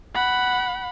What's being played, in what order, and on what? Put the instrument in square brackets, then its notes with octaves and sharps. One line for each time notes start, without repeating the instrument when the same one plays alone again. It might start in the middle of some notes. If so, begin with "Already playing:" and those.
[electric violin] F#5 B5